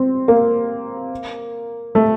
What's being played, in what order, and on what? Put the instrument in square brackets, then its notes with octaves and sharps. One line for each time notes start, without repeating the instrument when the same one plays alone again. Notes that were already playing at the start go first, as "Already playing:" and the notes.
Already playing: [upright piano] C4
A#3
A3